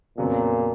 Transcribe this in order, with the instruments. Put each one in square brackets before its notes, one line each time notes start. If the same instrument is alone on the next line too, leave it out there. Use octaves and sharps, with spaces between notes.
[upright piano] F2 C#3 F#3 B3 [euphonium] A#2